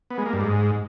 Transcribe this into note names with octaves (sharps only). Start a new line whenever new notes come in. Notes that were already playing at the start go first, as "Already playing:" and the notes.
B3
G#3
A#3
G2
G#2